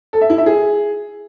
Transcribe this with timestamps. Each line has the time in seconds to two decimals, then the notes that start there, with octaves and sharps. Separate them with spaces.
0.13 A4
0.21 E5
0.30 E4
0.38 E5
0.46 G#4